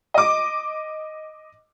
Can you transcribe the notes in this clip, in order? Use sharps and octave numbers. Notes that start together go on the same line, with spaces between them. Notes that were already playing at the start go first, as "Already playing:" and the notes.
D#5 D6